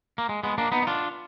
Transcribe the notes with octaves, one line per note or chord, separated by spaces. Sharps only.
A#3
G#3
G#3 B3
A#3 D4
B3 D#4
D#4
D4 F4